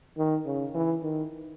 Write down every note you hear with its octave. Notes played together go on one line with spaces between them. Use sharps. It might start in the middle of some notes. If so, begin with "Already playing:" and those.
D#3
C#3
E3
D#3